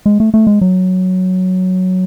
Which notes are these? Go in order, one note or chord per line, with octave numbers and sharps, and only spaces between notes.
G#3
A3
A3
G#3
F#3